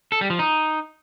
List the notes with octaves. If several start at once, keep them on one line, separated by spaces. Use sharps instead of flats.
A4
G3
F3
D#4